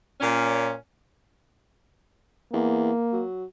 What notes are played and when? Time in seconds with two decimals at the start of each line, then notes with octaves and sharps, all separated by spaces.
0.20 A#2 C#4
2.53 E2 A#3
3.13 F#3